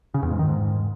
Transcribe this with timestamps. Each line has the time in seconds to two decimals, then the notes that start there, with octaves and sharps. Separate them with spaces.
0.14 C#3
0.23 E2
0.31 G#2
0.39 D#3
0.48 G#2